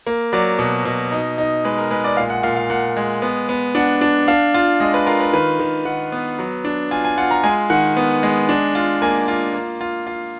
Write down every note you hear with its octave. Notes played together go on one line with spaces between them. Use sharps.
A#3
F#3 D5
B2
B2
D#4
D#4
G#3 B4
A#4
G#3 B4
D5
A#2 F5
F#5
A#2 F5
F5
A#2 F#5
G#3
B3
B3
D4 F#5
D4
D4 F5
F4
G#3 D#5
B4
F4 A#4
B4
D#3 B4
D#3
D#3 F#5
B3
F#3
D4
F4 G#5
G#5
F4 F#5
A#5
G#3 G#5
D#3 F#5
B3
G#3
D4
F4
A#3 G#5
F4
A#3
F4
F4